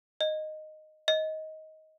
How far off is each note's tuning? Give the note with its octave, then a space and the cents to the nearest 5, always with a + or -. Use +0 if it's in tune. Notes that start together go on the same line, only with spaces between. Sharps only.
D#5 -5
D#5 +15